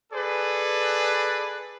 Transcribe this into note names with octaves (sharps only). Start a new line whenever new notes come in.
G#4 A4 B4 D5